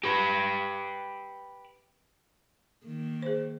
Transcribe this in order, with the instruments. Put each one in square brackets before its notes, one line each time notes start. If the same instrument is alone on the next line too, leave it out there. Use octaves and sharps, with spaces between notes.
[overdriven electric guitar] G4 B4
[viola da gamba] D#3 A#3
[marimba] G#4 C5